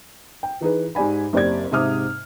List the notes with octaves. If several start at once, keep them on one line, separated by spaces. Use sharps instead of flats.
G5
E3 D#4 G#4 B4
G#2 G4 D5 G#5 B5
F#1 C4 G4 D5 G#6
G#2 C3 E5 D6 D#6 F6